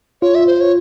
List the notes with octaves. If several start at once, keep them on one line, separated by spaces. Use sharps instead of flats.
F4 C#5
E5
C5
C#5